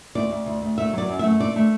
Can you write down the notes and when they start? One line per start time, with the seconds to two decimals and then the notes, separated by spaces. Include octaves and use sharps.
0.15 D2 D5
0.31 D2
0.46 D2
0.62 D2
0.78 A3 E5
0.93 F#3 D5
1.09 F#2
1.19 A3 E5
1.40 D3 D5
1.56 A3